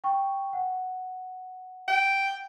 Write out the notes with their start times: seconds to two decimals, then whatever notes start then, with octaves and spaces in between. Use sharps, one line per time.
0.04 G5 C#6
0.53 F#5
1.88 G5